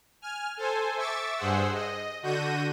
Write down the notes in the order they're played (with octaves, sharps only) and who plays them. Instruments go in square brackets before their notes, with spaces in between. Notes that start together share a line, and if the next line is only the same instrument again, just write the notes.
[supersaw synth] G#5 F6
A4 C5 G#5
E5 C#6 D6 E6 A6
G2 G#4 C5 F#5 E6
D#5
D3 F#4 G6 A#6 D#7